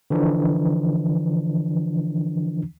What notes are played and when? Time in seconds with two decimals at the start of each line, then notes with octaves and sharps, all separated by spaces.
0.10 D3 E3 F3 D4